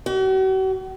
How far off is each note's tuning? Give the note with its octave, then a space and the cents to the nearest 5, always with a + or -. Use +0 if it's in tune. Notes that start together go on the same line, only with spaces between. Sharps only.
F#4 +45